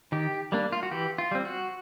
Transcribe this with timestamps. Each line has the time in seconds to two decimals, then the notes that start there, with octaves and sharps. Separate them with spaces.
0.12 D#3 G4
0.52 G3 A#3 D4
0.72 F4
0.83 F#4
0.91 E3 G4
1.18 F4
1.31 G3 C4
1.45 F#4